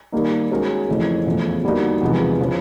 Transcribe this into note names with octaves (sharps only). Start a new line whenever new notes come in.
D#3 G3 A#3 D#4
G#3 C#4 F#4 A#4
F2 C#3 E3 A3
E2 C#3 F3 A3
D3 G3 A#3 D#4 F#4
E2 C3 F3 G#3 B3
C#3 F3